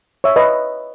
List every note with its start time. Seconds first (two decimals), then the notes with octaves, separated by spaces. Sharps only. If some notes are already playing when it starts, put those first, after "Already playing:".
0.24 C#5 E5
0.36 B4 D#5